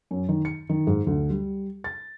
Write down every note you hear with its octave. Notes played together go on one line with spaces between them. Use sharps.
F#2
D#3
C#7
D#3
G#2
D2
G3
A6